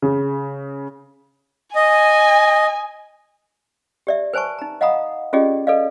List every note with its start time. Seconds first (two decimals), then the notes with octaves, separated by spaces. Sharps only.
0.02 C#3
1.76 D#5 G#5
4.07 G4 D5 E5
4.33 B4 C5 G#5 A5 C#6
4.59 D#4 A#5
4.81 D#5 F5 F#5 A#5 B5 D#6
5.33 C#4 F4 G4 G#4 D5 D#5
5.67 A4 B4 D5 D#5 F5